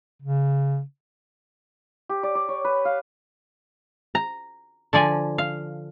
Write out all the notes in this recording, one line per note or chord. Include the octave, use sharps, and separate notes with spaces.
C#3
G4
D5
D5
C#5
B4
F5
A#5
D3 F3 D5 G#5
F5